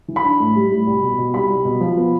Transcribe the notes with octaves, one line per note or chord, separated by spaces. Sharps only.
E3
B5
D4
A2
G3
A2
C2
B2
B2
C2 B5
C2
B2
F3
B3